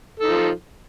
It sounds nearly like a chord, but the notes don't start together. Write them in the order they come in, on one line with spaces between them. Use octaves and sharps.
A4 D#4 F3